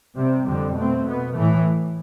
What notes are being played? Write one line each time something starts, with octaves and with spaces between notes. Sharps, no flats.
C3 G3 C4
F2 D3 G3 C4
B2 A3 C4
B2 B3
A2 E3 A3